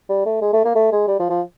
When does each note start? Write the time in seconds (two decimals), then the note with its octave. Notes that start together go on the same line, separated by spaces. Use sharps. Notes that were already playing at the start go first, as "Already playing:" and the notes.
0.09 G3
0.26 A3
0.42 G#3
0.53 A3
0.65 A#3
0.75 A3
0.92 G#3
1.07 G3
1.19 F3
1.30 F3